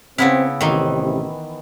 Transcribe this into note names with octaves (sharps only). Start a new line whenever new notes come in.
C#3 B3 C4 E4
A1 C3 D#3 E3